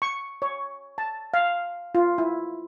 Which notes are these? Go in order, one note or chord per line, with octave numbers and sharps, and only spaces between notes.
C#6
C#5
A5
F5
F4
E4